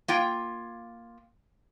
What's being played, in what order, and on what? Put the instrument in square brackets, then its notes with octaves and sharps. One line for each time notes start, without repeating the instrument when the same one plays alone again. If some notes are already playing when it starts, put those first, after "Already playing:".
[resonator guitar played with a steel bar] A#3 F4 G5